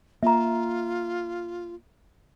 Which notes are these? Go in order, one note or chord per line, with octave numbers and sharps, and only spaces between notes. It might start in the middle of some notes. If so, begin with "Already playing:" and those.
A#3 F4 E5 A#5